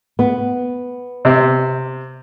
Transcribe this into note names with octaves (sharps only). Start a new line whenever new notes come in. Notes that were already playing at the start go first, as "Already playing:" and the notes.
B3
C3